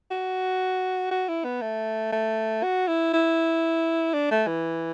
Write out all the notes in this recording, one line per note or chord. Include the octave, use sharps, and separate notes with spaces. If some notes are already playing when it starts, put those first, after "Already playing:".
F#4
F#4
E4
B3
A3
A3
F#4
E4
E4
D4
A3
E3